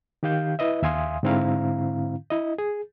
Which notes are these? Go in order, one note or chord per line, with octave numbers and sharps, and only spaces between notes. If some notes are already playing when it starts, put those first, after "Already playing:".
D#3 G4 F5 G6
E4 B4 D#5 E5
D#2 E5 F5 G#5 C6 D#6
G#2 D3 C4 E4 F5 A#5
E4 D#5
G#4